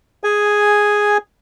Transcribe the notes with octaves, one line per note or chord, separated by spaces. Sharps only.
G#4 G#5